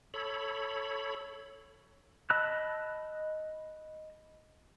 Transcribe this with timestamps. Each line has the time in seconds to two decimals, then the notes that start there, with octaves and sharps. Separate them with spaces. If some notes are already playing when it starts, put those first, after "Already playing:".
0.14 A4 C#5 B5
2.30 D#5 A5 B5 E6 F#6